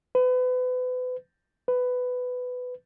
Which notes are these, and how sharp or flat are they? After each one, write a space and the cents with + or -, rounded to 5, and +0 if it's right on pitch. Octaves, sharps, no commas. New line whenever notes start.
B4 +35
B4 +15